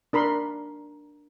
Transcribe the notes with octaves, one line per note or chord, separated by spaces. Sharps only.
D4 A#4 B5 C6